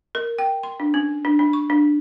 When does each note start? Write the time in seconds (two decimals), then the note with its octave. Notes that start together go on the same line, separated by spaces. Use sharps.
0.15 A#4
0.38 G5
0.63 C6
0.80 D4
0.94 C#4
1.25 D4
1.39 D#4
1.53 C#6
1.70 D4